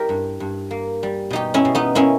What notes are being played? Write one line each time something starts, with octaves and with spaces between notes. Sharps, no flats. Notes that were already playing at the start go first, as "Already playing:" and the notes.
Already playing: G3 E4 G4 A#4
G2
G2
A#3
G3
B2 D#4 G4
C#4 E4
B2
B3 D#4
A#3 C#4 E4